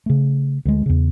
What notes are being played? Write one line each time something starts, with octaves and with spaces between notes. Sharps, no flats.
C#3 A3
D2 G#3
E2 C#3